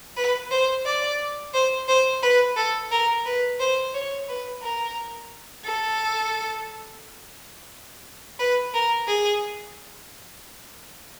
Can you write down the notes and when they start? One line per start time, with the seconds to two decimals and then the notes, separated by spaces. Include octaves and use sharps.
0.17 B4
0.51 C5
0.85 D5
1.54 C5
1.88 C5
2.22 B4
2.56 A4
2.91 A#4
3.26 B4
3.60 C5
3.94 C#5
4.29 B4
4.62 A#4
5.65 A4
8.39 B4
8.74 A#4
9.07 G#4